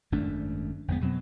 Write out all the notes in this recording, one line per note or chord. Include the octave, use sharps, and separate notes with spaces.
G#1 F#2 A3 D4
G1 F2 G#3 B3
B2 F#3 B3 C4